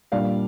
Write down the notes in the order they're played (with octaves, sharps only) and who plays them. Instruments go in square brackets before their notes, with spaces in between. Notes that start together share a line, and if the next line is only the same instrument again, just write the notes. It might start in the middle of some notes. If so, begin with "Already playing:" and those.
[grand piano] A#2 G3 D4 D5 F5